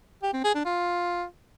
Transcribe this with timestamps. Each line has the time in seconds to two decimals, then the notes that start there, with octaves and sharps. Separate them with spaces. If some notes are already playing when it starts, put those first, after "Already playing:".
0.23 G4
0.33 C4
0.44 G#4
0.55 D4
0.65 F4